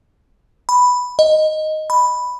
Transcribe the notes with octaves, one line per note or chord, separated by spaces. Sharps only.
B5
D#5
B5